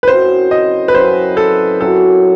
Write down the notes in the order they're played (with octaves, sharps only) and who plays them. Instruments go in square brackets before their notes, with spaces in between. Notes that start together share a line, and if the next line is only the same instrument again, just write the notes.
[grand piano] B4
[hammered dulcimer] F#2 F#3 C4 E4 [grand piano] C5
[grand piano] D#5
B4
[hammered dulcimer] F#2 F#3 C4 E4 [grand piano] C5
[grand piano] A4
[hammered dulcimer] F#2 F#3 C4 E4 [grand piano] A4